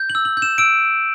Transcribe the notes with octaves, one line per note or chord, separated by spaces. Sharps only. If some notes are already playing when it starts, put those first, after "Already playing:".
Already playing: G6
F#7
E6
F#7
G6
E7
E6 D7